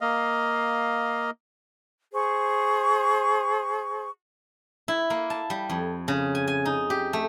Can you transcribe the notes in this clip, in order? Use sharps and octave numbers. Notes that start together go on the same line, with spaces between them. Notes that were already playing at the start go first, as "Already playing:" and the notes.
A#3 D#5 F5
G#4 C5 C#6
E4
A#3
A5
G3
F2
C#3
G#5
G#5
D#4
G4
A3